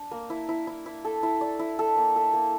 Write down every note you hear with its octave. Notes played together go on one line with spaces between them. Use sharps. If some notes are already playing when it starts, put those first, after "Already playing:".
Already playing: D4
A#3
E4
E4
E4
E4
A4
E4
D5
E4
A4
A#3
A4
A#3